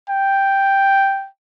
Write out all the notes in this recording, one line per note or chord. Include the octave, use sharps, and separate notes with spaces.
G5